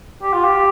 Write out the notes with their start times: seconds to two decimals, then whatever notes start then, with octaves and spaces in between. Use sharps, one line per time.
0.22 G4
0.33 F4
0.44 G4